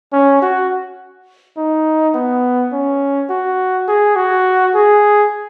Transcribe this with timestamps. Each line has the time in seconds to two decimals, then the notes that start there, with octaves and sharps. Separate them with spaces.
0.13 C#4
0.42 F#4
1.57 D#4
2.14 B3
2.72 C#4
3.30 F#4
3.88 G#4
4.16 F#4
4.74 G#4